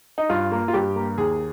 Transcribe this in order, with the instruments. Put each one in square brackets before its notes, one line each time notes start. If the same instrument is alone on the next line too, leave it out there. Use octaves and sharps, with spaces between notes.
[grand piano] D#4
G2 F4
A#3
F4
G2 G4
A#3
D#2 G#4